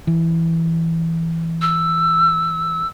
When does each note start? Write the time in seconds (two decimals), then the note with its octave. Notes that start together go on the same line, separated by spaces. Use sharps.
0.07 E3
1.61 E6